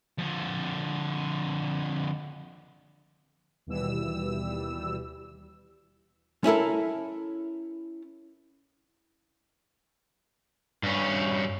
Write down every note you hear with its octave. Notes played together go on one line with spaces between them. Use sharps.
F2 D3
D#2 B2 E3 G3 E6
C#4 E4 A4 A#4
G2 C#4